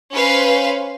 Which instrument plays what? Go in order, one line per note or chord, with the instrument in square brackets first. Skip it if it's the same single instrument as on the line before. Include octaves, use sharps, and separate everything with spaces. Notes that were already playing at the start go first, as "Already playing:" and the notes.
[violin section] C#4 B4 C5 F5